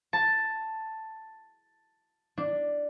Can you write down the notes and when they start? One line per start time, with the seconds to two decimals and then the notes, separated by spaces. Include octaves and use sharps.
0.13 A5
2.38 D4